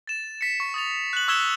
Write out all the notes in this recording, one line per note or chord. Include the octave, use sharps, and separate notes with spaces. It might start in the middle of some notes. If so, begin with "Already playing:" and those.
A6 E7
B6 C#7
C#6
D#6 A6 F7
F#6 F#7
C#6 E6 G#6 B6 E7 G7